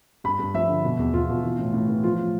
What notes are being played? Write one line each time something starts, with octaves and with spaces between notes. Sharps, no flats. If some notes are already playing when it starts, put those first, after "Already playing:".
G2 B5
G2
F3 E5
D3
B2
E2
E2 F4
B2
E3
A2
A2
E3
F3 F4
A2